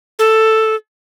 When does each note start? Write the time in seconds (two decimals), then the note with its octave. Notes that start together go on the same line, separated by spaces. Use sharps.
0.19 A4